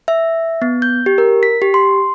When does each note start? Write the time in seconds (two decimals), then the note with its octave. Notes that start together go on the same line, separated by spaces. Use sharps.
0.08 E5
0.62 B3
0.82 G6
1.06 G4
1.18 A#4
1.43 B6
1.62 G4
1.74 C6